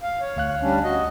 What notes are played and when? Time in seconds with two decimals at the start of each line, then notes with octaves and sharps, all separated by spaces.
0.02 F5
0.21 C#5
0.37 D2 F5 F#6
0.62 G3 C#4 D4
0.84 F#4 D#5